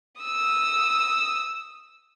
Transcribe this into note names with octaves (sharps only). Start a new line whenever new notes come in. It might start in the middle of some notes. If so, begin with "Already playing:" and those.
D#6 E6